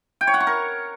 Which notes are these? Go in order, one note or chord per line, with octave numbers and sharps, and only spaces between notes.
G5
C#5
F#5
C#6
A#4